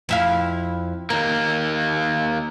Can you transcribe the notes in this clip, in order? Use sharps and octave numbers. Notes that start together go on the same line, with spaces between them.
F2 E4 F5
D#2 A#3 A#4